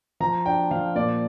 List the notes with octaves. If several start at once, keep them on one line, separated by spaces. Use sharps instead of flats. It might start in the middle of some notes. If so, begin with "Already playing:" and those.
F3 A#5
D4 G5
F3 F5
A#2 D5